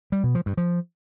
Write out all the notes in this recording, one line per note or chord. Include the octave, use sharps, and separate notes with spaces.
G3
B2
F3
G2
F3